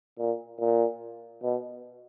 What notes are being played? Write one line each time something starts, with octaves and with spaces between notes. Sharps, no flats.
A#2
A#2
B2